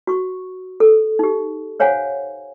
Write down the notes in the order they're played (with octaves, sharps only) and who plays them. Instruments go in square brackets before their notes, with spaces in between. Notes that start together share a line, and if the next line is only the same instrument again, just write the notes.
[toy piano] F#4 C#6
A4
D#4 G4
C5 C#5 F5 F#5 G#5